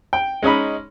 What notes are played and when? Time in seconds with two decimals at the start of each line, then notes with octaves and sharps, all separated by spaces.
0.13 G5
0.43 G#3 C#4 D#4 B5